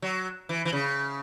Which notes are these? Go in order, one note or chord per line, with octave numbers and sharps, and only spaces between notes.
F#3
E3
E3
C#3